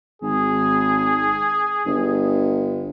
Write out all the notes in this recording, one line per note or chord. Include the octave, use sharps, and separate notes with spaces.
G#1 G#4
G1